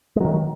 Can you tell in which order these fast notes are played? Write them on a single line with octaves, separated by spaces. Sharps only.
G#3 F#3 D#3